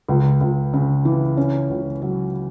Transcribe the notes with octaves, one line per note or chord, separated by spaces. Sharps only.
C#2
C#2
C#3
E3
C#4
C#2
F#3